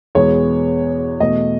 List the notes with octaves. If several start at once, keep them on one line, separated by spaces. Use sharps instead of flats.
E2 B2 G#3 B3 C#5
E2 B2 A3 D#5